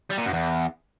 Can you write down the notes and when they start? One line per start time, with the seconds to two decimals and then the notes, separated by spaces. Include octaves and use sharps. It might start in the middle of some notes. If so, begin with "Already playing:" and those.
0.11 G3
0.18 A#2
0.26 F#2
0.33 E2